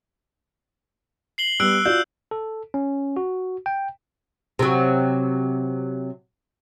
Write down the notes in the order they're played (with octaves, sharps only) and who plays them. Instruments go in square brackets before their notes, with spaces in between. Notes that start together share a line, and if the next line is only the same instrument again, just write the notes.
[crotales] C7 F#7 G7
[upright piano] G3 B3 [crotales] E6 F#6 D7
[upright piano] F4 F#4 D5 [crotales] E6 G6
[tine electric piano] A4
C#4
F#4
G5
[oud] C3 F#3